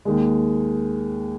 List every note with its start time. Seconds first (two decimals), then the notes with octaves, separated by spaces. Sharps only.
0.05 D#2 D#3 G#3